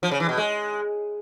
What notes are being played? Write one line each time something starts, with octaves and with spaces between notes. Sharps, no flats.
F3
C#3
E3
B2
G#3